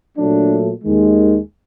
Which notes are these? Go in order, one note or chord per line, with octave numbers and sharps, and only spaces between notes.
A#2 F#3 A3 D4
D#2 D#3 G#3